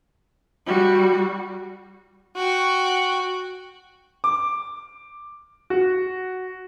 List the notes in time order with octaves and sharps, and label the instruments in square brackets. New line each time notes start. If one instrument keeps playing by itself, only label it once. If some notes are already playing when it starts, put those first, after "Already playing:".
[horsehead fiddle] G3 F#4
[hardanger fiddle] F#4 G5
[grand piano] D6
F#4